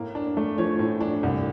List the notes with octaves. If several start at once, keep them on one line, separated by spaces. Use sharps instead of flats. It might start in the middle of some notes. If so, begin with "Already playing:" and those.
Already playing: A2 A#3
D4
A3
F3 C#5
A2
D4
C2